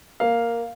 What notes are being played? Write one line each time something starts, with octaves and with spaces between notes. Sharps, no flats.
A#3 F5